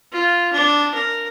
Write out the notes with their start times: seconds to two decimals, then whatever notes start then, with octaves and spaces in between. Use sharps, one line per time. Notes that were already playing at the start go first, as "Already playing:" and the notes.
0.12 F4
0.53 D4
0.94 A#4